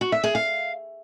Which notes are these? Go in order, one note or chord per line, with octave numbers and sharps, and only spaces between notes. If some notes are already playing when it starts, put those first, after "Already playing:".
F#4
E5
G#4
F5